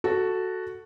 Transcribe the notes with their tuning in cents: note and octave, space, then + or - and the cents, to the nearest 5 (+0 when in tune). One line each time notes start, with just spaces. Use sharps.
F#4 +0 A4 +0